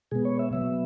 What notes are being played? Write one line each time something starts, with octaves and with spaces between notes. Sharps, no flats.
B2 G#3 B3 G#4
C#5
E5
B2 F#3 B3 E5